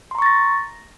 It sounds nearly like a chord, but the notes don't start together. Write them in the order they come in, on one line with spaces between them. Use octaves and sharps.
C6 A#5 C#6 A6 A#6